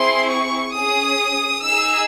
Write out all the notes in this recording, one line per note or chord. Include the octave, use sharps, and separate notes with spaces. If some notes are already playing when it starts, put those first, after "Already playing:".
Already playing: C4 E4 G#4 C6
C#6
C#4 G#4 D#6
D#4 G#4 E6